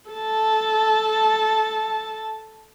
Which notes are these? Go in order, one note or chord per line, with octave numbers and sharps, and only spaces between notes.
A4 A5